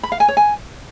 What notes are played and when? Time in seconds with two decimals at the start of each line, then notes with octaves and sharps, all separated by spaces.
0.03 B5
0.12 F5
0.20 G#5
0.28 C#5
0.37 G#5